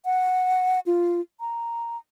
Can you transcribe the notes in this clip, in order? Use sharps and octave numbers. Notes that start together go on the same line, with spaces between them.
F#5
F4
A#5